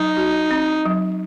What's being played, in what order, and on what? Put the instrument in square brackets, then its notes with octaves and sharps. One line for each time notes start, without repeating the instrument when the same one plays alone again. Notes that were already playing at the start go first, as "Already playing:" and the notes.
Already playing: [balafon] F#3 [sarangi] D#4
[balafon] F#4
C4
F#3